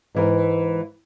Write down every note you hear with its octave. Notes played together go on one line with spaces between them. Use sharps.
G#2 E3 A#4